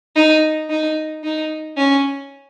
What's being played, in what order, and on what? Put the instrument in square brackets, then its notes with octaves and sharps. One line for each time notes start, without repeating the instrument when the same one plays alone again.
[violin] D#4
D#4
D#4
C#4